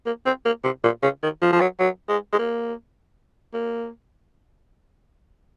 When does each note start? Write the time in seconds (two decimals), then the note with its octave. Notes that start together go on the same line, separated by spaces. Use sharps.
0.06 A#3
0.26 C4
0.45 A#3
0.64 C3
0.84 A#2
1.03 C#3
1.23 D#3
1.42 F3
1.52 F3
1.61 F#3
1.80 F#3
2.09 G#3
2.33 G#3
2.39 A#3
3.54 A#3